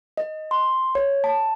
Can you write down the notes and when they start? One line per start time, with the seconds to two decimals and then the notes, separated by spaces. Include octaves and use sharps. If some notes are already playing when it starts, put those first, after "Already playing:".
0.17 D#5
0.51 C6
0.95 C#5
1.24 A5